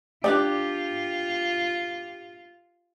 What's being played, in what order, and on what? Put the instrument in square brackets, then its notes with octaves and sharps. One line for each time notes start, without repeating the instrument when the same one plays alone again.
[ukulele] D4 D#4 D5 [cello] F4 [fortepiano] G4